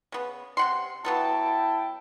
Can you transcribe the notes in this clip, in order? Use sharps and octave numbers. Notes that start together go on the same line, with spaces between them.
C#3 B3
C3 F#5 C6
F#3 B3 E4 A4 G5 A5